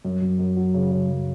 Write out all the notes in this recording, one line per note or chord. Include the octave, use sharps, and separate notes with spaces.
F#2
F#2
F#2
F#3
C#3
C#3
F#2